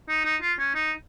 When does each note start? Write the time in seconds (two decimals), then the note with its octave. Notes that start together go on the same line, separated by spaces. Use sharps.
0.09 D#4
0.25 D#4
0.42 F4
0.59 C#4
0.75 D#4